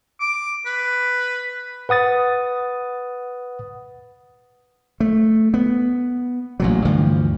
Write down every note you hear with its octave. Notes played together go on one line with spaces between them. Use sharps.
D6
B4
B4 F#5 D#6 A6
A3
B3
A1 A#2 F#3
D2 G2 E3 F3